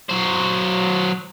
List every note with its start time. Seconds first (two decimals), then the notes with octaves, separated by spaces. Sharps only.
0.09 F#3 C5